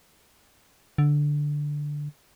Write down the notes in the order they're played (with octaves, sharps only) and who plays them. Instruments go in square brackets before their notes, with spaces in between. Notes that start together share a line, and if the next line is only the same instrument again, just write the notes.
[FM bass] D3